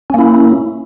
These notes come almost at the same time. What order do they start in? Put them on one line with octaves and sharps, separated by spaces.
C#4 A#3 E4